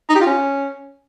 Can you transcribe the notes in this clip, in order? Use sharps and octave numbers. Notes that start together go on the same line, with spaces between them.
D#4
G4
F4
C#4